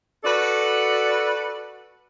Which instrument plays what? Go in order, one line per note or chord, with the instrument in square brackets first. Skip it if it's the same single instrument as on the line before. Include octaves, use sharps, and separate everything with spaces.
[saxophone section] F#4 A4 B4 D5